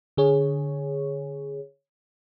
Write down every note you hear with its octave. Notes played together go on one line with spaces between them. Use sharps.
D3 G#4 C#5